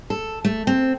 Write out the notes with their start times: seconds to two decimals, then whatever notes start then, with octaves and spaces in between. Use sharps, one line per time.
0.10 A4
0.45 A3
0.67 C4